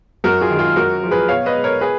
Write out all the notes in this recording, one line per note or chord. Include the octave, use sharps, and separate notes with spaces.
F#2 F#4 A#4
F4 G#4
D#3 G#3
F4 G#4
F#2 F#4 A#4
F3 G#3
G#4 B4
B2 C#5 F5
B4 D#5
G#3
A#4 C#5
G#4 B4